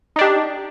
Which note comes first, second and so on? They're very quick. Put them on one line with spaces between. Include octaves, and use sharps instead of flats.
D#4 D4 G4